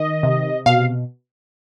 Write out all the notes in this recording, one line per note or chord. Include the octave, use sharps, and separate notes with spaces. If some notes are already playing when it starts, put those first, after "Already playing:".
Already playing: D#3 D#5
C3
B2 F5